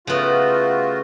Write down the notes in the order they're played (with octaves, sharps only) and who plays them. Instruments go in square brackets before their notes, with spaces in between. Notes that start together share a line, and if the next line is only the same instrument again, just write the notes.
[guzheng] C#3 B3 [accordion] A3 F4 F#4